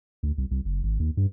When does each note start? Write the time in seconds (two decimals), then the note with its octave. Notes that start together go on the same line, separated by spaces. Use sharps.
0.23 D2
0.38 C2
0.51 C2
0.65 F#1
0.83 G#1
1.00 D#2
1.17 G2